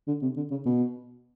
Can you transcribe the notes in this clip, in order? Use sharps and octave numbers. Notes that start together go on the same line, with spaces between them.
D3
C3
D3
C#3
B2